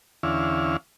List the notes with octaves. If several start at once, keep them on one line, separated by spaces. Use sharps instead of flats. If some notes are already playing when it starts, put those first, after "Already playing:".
E2 D3 C#4 E4 F5